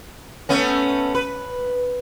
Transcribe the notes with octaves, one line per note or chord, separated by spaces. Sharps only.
A3 B3 C#4
B4